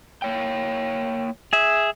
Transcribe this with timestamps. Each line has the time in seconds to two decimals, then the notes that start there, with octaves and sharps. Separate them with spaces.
0.22 A#3 C#5 G5
1.53 G#4 E5